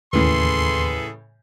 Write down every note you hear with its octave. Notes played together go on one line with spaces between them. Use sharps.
D#2 A2 C#3 E3 G#4 A4 B4 C6